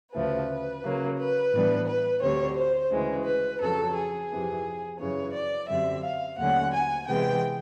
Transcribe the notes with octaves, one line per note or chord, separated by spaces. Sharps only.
D2 C#3 F3 A3 B4
C#3 F#3 A#3
B4
A2 E3 G3 B3 D4
B4
D2 D3 G3 C4 C#5
C5
D2 C#3 E3 G#3
B4
F2 C#3 F#3 A4
G#4
F2 C3 E3
F#2 C#3 E3 C#5
D5
F#2 D3 G3 C4 E5
F5
D#2 D3 F#3 A3 C#4 F#5
G#5
C3 E3 G#3 B3 G5